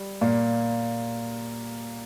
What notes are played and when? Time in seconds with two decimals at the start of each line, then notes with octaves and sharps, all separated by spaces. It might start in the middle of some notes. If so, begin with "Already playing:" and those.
Already playing: G3
0.21 A#2 A#3